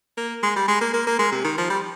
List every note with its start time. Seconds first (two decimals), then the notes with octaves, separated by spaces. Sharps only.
0.17 A#3
0.43 G#3
0.56 G3
0.68 G#3
0.81 A#3
0.94 A#3
1.07 A#3
1.19 G#3
1.32 C3
1.45 D#3
1.58 F3
1.70 G3